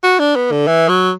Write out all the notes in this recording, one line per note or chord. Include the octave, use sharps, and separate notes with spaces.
F#4
D4
B3
D3
E3
F#3